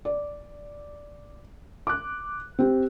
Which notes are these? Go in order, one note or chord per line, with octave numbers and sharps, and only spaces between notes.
D5
D6 F#6
C4 G4